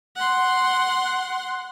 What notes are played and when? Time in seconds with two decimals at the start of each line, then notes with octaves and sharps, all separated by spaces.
0.16 F#5 C6